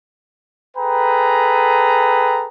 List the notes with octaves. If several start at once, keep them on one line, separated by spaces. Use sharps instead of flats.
G#4 A4 B4 G5 A#5